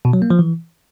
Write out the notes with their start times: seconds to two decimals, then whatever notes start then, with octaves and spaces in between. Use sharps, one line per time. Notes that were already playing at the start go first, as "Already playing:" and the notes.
0.05 B2
0.13 F#3
0.22 A#3
0.30 F3
0.39 E3